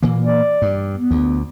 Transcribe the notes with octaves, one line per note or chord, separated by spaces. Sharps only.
A#2 E3 A#3
D5
G2
B3
D2